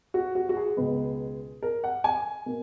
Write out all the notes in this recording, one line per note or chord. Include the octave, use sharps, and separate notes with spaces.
F#4
F#4
F#4
G#4
C#2 B2 G#3 B3
A#4
F#5
G#5
B2 A#3